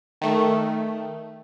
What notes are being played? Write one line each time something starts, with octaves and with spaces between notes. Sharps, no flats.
D#3 A3